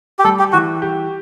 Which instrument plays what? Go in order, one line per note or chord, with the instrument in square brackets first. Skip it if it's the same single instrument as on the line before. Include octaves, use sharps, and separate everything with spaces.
[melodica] G4
[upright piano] G3 [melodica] A4
[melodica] G4
[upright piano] E3 [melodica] F#4
[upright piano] G4